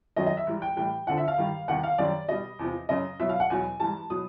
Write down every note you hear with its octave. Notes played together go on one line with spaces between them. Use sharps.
F#2 D#3 F#3 D#5
D#5
E5
G#2 E3 G3
G5
A2 E3 G3 G5
F2 D3 F3 F#5
E5
F5
G2 D#3 G3
E2 C3 D#3 G3 F#5
F5
F#2 D#3 G3 D5
B2 G3 D#5
E2 C3 F3
F#2 C#3 F#3 D#5
B2 F#3 E5
F5
F#5
E2 B2 F#3 G#5
G#2 E3 G3 A5
B2 F#3 D#6